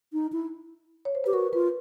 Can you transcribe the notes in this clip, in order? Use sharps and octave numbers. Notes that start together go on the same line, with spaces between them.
D#4
E4
C#5
C5
G4 B4
F#4 A#4
F4 B4